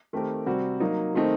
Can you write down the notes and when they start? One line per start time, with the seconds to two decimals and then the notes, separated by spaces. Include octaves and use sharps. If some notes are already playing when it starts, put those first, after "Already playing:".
0.13 D#3 A3 C4 G4 A#4
0.46 C3 G3 C4 F#4
0.80 F#3 A#3 D#4
1.15 D#3 A3 C4 D#4